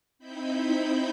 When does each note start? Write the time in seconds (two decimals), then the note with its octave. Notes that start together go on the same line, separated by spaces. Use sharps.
0.19 C4 D#4 E4 B5 G6